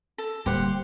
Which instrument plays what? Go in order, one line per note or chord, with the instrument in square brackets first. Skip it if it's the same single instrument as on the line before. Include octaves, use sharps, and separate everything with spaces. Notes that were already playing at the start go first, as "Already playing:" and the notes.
[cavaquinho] A4
[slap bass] D1 G3 A#3 [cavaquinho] G4 C5 F#5